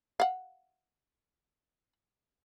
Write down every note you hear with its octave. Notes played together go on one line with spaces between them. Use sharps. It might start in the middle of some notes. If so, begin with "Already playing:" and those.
F5 F#5